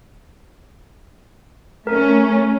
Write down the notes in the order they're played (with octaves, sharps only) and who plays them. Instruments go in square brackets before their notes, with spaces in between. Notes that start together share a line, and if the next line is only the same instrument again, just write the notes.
[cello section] A3 C#4 [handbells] A#4